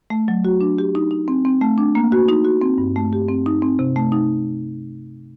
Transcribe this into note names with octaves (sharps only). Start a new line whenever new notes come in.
A3
F#3
F#4
D4
G4
D#4
D#4
C4
C4
A3
D4
A#3
F#4
D#4
F#4
C4
G2
A3
G4
C4
D#4
C4
C3
A3
D#4